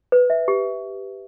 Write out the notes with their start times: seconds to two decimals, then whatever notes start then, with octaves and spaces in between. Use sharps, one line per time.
0.12 B4
0.30 E5
0.48 G4